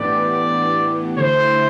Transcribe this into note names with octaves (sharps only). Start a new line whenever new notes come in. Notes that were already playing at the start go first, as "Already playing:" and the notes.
Already playing: A2 E3 B3 D4 G4 D5
D3 A3 E4 C5